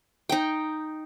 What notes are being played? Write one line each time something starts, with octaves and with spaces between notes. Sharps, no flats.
D#4 G5